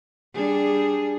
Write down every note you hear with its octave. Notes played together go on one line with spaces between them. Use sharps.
G3 D4 G#4